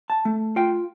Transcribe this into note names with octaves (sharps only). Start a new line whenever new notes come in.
A5
A3
F4 G5